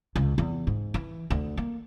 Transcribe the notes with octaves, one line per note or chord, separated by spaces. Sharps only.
C#2
E2
G#2
E3
D2
A#3